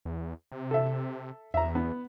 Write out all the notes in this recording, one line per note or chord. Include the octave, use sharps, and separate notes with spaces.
E2
C3
A4 E5
E2 E5 A#5
B3